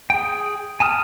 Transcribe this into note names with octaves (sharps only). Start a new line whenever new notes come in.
G#4 G5
G#5 A5 D#6 F6